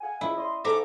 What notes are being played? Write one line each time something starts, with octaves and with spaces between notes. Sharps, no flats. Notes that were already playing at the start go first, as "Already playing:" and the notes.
F5 F#5 G#5
C#2 E4 D#5
D5 D#5 C6
G#2 A4 E5 A#5 D6